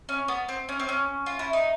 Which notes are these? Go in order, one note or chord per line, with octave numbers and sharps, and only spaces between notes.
C#4
B3
C4
C#4
C4
C#4
F4
E4
D#4